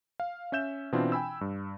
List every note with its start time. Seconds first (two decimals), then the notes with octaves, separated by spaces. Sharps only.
0.20 F5
0.52 C#4 E5 G6 E7
0.92 B2 E3 C4 D4 E4 F4
1.12 G5 G#5 B5 E6
1.41 G2